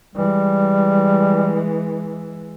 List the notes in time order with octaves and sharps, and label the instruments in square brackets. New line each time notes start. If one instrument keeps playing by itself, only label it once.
[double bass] E3 G#3 [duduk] G3